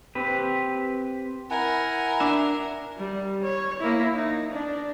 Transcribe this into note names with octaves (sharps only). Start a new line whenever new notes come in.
C4 G4 B4
E4 A#4 F#5 G#5
D4 E5
G3
C#5
A#3 E4
D#4
D4